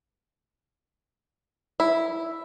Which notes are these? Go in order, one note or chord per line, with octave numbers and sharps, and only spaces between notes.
E4